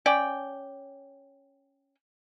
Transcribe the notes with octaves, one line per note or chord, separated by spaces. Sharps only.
C#4 D5 G5